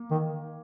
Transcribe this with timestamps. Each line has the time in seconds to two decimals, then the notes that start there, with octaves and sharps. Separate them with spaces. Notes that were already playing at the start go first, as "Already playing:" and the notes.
Already playing: A#3
0.11 D#3